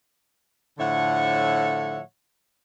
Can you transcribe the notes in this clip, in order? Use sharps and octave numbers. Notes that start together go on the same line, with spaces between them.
A2 D3 F3 C#5 E5 F#5